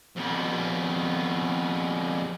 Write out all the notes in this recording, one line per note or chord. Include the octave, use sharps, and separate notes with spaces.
F2 B3